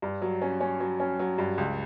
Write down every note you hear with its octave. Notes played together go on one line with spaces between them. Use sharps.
G2
F#3
C#4
C#4
F#3
C#4
F#3
G2
C#2